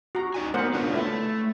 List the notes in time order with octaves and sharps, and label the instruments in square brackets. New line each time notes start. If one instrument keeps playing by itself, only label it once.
[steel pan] F#4 A#5
[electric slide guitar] D#4 D5 G#5
[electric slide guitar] A#3 B3 [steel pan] A#4 C5 F#5
[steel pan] D4 [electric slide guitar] F4 B4 C#5
[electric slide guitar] A3 [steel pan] E4